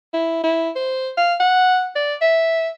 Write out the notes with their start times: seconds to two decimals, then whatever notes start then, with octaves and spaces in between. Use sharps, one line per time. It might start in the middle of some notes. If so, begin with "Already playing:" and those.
0.13 E4
0.44 E4
0.76 C5
1.17 F5
1.40 F#5
1.96 D5
2.22 E5